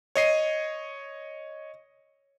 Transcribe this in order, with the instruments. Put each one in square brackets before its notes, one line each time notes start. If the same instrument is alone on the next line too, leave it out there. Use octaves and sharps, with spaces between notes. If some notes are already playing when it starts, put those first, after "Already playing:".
[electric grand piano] C#5 D#5 C7 D#7